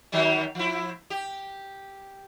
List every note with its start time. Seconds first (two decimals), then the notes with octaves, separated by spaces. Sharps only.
0.12 D#3 F#3 G3
0.55 F3 E4
1.10 G4